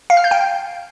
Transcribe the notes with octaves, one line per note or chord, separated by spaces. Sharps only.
F5
F6
G6
G5